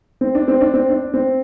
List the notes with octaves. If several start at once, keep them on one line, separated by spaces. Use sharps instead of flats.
C4
D4
C4
D4
C4
D4
C4